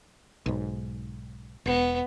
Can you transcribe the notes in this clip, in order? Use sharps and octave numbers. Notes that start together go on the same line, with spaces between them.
B1 G#2
E1 B3